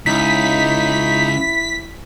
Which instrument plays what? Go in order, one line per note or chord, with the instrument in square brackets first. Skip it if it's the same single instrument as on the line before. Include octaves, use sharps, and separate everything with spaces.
[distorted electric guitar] C#2 [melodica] D#4 [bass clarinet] E4 [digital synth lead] B6